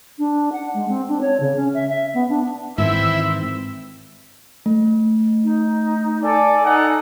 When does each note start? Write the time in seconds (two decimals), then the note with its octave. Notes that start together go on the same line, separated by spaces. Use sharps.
0.18 D4
0.52 F#5
0.74 G#3
0.88 C4
1.08 D4
1.21 C#5
1.40 C#3
1.56 C#4
1.74 E5
1.88 E5
2.14 B3
2.29 D4
2.78 G#2 D#3 E3 C4 E4 E5
4.66 A3
5.44 D#4
6.23 A4 D5 G#5
6.63 D#4 A4 F#5